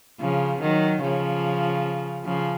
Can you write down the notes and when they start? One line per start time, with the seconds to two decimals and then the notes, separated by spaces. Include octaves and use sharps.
0.20 C#3 F3
0.61 D#3 F#3
1.02 C#3 F3
2.25 C#3 F3